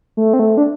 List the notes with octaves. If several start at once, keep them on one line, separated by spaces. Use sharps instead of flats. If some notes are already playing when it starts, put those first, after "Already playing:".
A3
C4
A3
D4